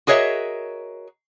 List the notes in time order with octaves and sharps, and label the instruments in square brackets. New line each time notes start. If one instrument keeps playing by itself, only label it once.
[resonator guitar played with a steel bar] F#4 G#4 A#4 C#5 D#5 E5